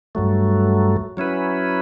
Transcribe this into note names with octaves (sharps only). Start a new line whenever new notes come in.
G2 F#3 A3
F#3 C#4 E4 B4